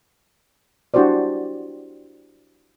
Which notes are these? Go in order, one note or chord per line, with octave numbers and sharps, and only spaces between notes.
D4 E4 F#4 G4 C5 D5